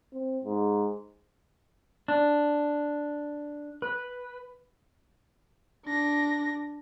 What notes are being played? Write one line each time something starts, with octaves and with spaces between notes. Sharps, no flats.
C4
G#2
D4
B4
D4 A#6